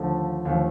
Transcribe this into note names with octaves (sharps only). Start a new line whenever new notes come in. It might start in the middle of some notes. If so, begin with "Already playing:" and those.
Already playing: D#2 D3 F3 A3
D#2 D3 F3 A3